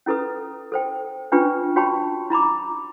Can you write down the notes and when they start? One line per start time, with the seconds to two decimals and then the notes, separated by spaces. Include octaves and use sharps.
0.06 C#4 E4 A4 B4 D#6
0.72 A4 C5 G5
1.32 C#4 D4 F4 B4 G5 C#6
1.76 F#4 C#5 G5 A5 B5 C#6
2.30 E4 A#5 B5 D6